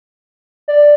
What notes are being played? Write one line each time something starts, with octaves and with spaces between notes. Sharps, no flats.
D5